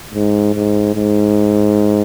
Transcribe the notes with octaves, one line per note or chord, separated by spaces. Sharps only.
G#2
G#2
G#2